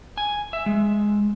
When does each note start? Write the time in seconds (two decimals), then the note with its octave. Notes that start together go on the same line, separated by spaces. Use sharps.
0.18 G#5
0.53 E5
0.66 G#3